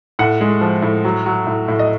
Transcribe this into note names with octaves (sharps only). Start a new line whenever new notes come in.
A2 F#5
G#3
F3
A2
F#3
F#3
A2
A2
D#5